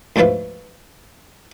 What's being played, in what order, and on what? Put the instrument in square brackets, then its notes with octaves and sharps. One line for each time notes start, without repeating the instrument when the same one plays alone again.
[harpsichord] D2 G#2 F3 F4 B4 E5